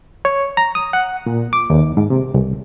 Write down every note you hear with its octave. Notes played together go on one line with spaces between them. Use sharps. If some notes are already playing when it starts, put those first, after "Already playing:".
C#5
A#5
D#6
F#5
A#2
D6
D#2
G#2
C3
C2